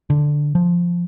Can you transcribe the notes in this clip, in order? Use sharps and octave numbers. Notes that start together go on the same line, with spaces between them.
D3
F3